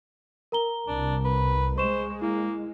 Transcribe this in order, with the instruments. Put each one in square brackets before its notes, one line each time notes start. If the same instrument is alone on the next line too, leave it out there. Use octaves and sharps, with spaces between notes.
[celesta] A#4 A#5 G7
[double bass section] C2 [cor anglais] D4
[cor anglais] B4
[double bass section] G#3 [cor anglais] C5 [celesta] C#6 E7
[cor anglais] A#3 [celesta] E4